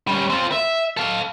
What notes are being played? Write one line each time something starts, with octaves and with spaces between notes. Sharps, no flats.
G3 C#4
C4 F4
E5
A4 F5